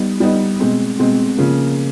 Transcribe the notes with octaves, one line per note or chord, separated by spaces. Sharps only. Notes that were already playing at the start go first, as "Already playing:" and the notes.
Already playing: G3 B3 D#4
G3 B3 D#4
B2 G#3 C4
B2 G#3 C4
C#3 F3 A#3